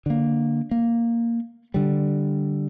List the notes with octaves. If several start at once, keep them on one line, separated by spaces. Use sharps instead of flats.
D3 A#3
A#3
D3 G3